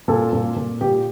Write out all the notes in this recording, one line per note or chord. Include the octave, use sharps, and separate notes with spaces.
A#2 A4
A#2
A#2
A#2 G4